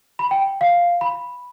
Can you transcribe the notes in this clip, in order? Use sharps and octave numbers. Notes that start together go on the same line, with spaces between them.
B5
G5
F5
B5